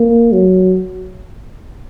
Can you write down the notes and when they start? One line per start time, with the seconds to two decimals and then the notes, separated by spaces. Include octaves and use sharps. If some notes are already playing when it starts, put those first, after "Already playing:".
Already playing: A#3
0.32 F#3